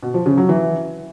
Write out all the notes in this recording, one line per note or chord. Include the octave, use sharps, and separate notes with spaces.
B2
F3
C#3
F#3
E3